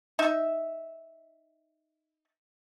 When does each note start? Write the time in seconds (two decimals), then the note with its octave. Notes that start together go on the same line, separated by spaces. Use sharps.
0.19 D#4 E5